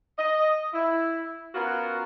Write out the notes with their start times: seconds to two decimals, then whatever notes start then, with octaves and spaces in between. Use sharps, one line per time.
0.18 D#5
0.74 E4
1.54 B3 C#4 F4 F#4 A#4